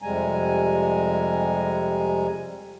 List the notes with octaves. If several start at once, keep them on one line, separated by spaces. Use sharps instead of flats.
F2 C3 G3 G#3 G#5 A#5